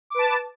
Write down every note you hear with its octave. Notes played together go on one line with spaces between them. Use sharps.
B4 A5 D6